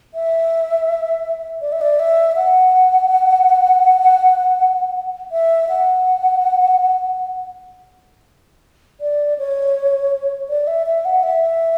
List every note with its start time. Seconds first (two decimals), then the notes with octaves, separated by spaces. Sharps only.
0.14 E5
1.61 D5
1.72 E5
1.81 D5
1.99 E5
2.36 F#5
5.32 E5
5.69 F#5
9.01 D5
9.38 C#5
10.49 D5
10.67 E5
10.87 E5
11.05 F#5
11.23 E5